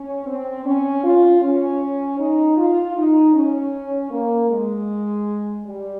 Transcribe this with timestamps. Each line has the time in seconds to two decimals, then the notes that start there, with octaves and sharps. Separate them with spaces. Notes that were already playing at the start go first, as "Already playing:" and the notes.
Already playing: C#4
0.26 C4
0.65 C#4
1.03 F4
1.42 C#4
2.19 D#4
2.57 F4
2.96 D#4
3.34 C#4
4.11 A#3
4.50 G#3
5.64 G3